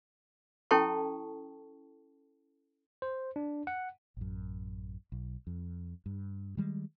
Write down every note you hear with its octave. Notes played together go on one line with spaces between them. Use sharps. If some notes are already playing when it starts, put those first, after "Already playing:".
C#4 E4 A4 G5 A5 C#6
C5
D4
F#5
A1 F#2
B1
F2
G2
D#3 G3 G#3